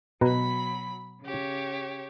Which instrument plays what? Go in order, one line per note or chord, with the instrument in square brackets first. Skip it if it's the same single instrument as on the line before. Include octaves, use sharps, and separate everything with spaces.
[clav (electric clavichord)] B2 B4 A#5 [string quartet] F#3 B5
[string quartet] C#3 G4 C#5